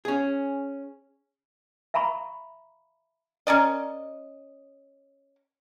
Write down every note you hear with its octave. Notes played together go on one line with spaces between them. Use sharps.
C#4 G#4
E5 F5 A#5 B5 C#6
C#4 A#4 D5 D#5